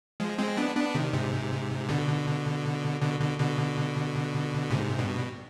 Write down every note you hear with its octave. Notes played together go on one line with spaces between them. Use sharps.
F3 G#3
G#3 C4
B3 D4
B3 D4
C3 D#3
G#2 C3
B2 D3
B2 D3
B2 D3
B2 D3
G#2 C3
G2 B2